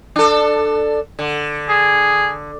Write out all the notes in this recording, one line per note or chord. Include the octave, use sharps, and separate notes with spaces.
D4 A4
D3
G#4